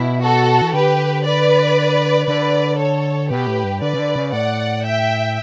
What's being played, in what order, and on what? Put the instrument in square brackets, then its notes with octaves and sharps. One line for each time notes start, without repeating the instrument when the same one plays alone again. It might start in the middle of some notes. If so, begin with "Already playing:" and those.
Already playing: [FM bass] B2 [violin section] E4
[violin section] F#4 A4
[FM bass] E3
[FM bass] D3 [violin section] G4 B4
[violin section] B4 D5
[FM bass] D3 [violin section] B4 D5
[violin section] A4 C#5
[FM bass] B2 [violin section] G4 B4
[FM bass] A2
G2
[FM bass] D3 [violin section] B4 D5
[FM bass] C#3
D3
C#3
[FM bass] A2 [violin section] D5 F#5
[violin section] E5 G5